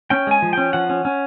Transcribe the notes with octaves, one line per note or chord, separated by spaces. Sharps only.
C#4 G5
G#3 G#5
F3
C#4 G5
F3 F#5
C#4
C#4